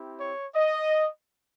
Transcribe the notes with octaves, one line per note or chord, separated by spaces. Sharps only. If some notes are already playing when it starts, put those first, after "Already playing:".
Already playing: C4 E4 G4
C#5
D#5